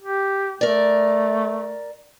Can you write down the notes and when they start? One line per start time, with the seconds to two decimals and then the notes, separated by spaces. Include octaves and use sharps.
0.02 G4
0.61 A3 A#4 D5